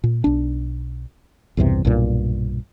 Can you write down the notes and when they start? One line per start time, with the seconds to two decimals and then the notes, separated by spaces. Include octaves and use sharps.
0.04 A#2
0.24 B1 D4
1.57 B1 E2 G2 C3
1.85 B1 G2 A#2